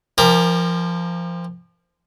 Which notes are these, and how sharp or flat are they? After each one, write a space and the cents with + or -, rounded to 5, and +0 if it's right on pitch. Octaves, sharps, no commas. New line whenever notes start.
F3 -20 G4 +35 A#4 +0